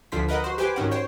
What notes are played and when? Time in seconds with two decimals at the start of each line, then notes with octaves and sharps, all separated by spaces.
0.12 D2 D3 F3 C5 B6
0.28 A#4 B4 D#5 F#5 A#5
0.44 F#4 C5
0.58 G4 B4 C5 G5 G#5 D6
0.76 G#2 D#3 C#4 F#4
0.91 C5 C#5 G5